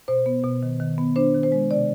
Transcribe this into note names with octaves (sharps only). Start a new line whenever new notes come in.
B2 C5
B3
B2
D#3
D#3
B3
D4 C5
D#3
C5
G#3
C3 D5